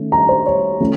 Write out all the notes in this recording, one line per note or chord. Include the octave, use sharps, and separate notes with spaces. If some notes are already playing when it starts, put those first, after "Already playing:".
Already playing: D#3 A3 C#4
A#5
C5
C#5
F3 A3 C#4